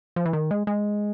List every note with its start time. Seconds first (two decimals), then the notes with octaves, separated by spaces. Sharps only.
0.16 F3
0.26 E3
0.33 D#3
0.51 G#3
0.67 G#3